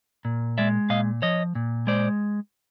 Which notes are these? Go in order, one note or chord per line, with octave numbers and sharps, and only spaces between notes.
A#2
G#3 D5 E5
A#2 D#5 F5
F3 C#5 D#5
A#2
G#3 C5 D5